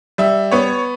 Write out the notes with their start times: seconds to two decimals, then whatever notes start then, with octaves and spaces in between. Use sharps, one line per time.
0.18 G3 E5
0.51 B3 C#5